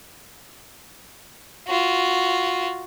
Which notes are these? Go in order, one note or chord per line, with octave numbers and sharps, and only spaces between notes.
F4 F#4